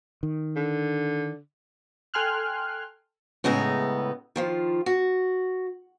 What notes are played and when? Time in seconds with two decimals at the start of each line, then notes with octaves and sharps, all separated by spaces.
0.23 D#3
0.56 D3
2.14 A4 G5 G#5 C6 F6 F#6
3.44 A2 C#3 G#3 B3 E5 A#5
4.36 D#3 F3 F4
4.86 F#4